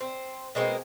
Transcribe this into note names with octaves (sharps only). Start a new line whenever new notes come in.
C4
B2 G#3 A#3 C4